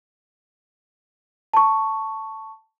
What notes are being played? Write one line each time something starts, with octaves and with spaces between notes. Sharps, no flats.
A5 C#6